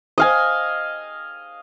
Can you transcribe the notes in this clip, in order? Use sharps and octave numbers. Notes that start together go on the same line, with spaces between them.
D#5 F5 G#5